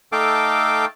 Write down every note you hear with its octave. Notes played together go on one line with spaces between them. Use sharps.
A3 D#4 A4 F5 G5 D6